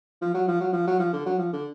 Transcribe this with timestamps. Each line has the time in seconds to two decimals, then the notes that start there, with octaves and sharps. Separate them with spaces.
0.22 F3
0.34 F#3
0.48 F3
0.61 F#3
0.73 F3
0.87 F#3
1.00 F3
1.13 D3
1.26 F#3
1.39 F3
1.53 D3